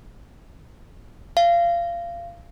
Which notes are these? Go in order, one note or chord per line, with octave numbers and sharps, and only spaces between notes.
F5